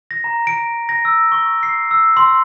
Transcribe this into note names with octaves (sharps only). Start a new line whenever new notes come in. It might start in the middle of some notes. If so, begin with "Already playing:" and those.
A#6
A#5
D7
A#6
E6
C#6
C7
E6
C6